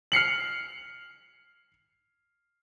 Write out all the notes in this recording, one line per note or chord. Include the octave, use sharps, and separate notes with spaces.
F6 C7 C#7 F#7